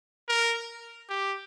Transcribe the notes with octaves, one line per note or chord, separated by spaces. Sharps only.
A#4
G4